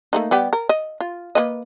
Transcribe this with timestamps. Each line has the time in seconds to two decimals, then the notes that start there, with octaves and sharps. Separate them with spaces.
0.13 A3 A#3 D#4
0.31 G3 B3 G4
0.53 A#4
0.69 D#5
1.00 F4
1.35 A#3 B4 D#5